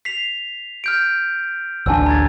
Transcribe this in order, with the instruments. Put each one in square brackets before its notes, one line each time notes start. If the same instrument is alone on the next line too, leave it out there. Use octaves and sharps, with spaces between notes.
[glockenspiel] B6 C7 F7
F6 G6 D7
[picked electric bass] A1 D2 D4 [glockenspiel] G#5 E6
[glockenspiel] A#5 G#6 A6